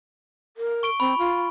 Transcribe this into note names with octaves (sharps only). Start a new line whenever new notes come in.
A#4
C#6 D7 G7
C4 B5
F4